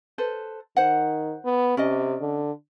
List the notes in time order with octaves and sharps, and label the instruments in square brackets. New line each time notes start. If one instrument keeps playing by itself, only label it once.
[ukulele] A4 B4 C5
[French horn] D#3 [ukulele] C5 F#5
[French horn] B3
[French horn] C3 [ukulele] C#4 D5 D#5
[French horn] D3